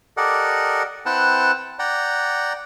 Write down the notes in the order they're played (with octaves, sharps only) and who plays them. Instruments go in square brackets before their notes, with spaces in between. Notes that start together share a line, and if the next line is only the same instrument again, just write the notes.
[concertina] G4 A4 A#4 D5 D#5 F#5
C4 E4 B4 F#5 G5 A5
D5 F#5 G5 A#5